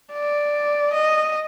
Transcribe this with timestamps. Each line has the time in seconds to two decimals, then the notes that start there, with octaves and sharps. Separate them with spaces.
0.13 D5
0.93 D#5